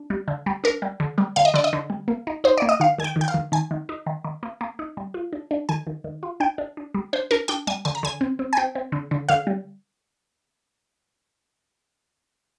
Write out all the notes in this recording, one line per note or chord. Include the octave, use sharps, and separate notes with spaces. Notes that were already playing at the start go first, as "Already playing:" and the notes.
Already playing: D4
G3
D3
G3
D4 A#4
G3
D3
G3
D3 F5
D#5
D3 D5
D#5
D3
G3
A#3
D#4
D#4 C5
A#3 D5
D#5
D#3 F5
D#3 G#5
G5
D#3
G5
F5
D#3
D#3 G#5
D#3
D#4
D#3
D#3
A#3
A#3
D#4
G3
F4
D4
D4
D#3 G#5
D#3
D#3
F4
D4 G5
D4
D4
G3
D4 C5
D4 A#4
D4 G5
G3 G#5
D3 G#5
A#5
D3 G#5
C4
C4
G#5
C4 G5
C4
D3
D3
D3 F5
G3